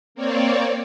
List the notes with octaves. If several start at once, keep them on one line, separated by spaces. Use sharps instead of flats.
A#3 C4 C#5 D5